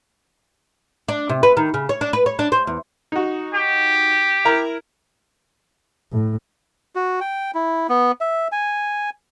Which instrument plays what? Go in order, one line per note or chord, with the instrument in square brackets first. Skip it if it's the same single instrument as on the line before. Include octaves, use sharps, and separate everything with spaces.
[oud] D4
C3
B4
D#3
C#3
C#5
D4
B4
C#5
D4
C5
E2
[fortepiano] D#4 F#4
[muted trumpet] G4
[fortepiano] E4 A#4 A#5
[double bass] A2
[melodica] F#4
G5
E4
B3
E5
G#5